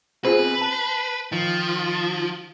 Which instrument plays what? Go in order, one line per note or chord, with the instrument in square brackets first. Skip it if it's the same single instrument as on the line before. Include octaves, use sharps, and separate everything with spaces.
[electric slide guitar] B2 C4 G#5 [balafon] F4 G#4 C5 [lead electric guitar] B4
[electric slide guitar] A5
[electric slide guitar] D#3 [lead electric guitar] F3